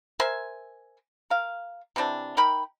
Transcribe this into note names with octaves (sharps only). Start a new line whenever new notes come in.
A#4 C5 E5 G#5
A#4 F5
C3 E3 C4 D4
D#4 A#4 G5 B5